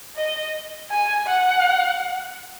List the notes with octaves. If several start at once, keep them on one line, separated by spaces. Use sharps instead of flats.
D#5
G#5
F#5